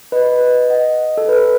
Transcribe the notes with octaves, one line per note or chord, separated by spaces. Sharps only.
B4 D#5
B4 D#5
D#5 F#5
A4
B4